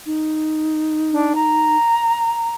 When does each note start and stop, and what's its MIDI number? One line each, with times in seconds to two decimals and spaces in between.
0.06 1.77 63
1.12 1.33 62
1.35 2.54 82